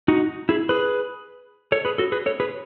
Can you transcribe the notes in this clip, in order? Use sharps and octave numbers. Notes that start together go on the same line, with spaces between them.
D#4 F#4
E4 G#4
G#4 B4
A4 C#5
G#4 B4
F#4 A4
G#4 B4
A4 C#5
G#4 B4